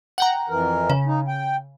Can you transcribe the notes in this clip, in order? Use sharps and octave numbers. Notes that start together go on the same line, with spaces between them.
F#5 G5 A#5
F2 E3 A#4
C#3
D#4
G5